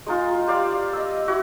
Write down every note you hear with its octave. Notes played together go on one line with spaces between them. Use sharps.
G#3 D#4 F4
G4 C5 D5 F5
D#5 E6
E4 F#4